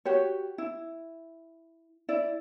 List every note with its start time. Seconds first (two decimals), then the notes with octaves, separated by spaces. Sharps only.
0.05 F#4 G4 C#5
0.58 E4
2.09 E4 D5